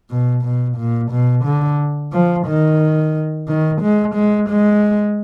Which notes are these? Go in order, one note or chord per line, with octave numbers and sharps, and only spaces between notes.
B2
B2
A#2
B2
D3
F3
D#3
D#3
G#3
G#3
G#3